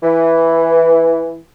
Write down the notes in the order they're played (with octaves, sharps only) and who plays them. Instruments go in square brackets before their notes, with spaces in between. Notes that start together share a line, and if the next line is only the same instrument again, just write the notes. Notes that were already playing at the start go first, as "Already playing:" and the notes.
[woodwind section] E3